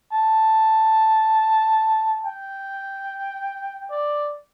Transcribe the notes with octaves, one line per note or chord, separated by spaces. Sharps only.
A5
G5
D5